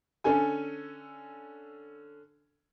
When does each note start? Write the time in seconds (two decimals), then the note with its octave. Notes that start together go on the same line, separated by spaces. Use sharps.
0.24 D3 C#4 A4 G#5